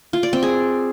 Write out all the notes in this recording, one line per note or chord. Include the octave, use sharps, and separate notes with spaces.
F4
D5
C4
G#4